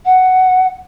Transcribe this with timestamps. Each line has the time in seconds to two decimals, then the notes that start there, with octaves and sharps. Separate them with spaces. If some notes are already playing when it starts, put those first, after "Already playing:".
0.05 F#5